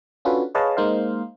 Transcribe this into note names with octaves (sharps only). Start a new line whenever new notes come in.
C#4 D4 F4 F#4 A4 B4
G#4 B4 C#5 D#5 F5 A5
G#3 A#3 D#4 C5 F5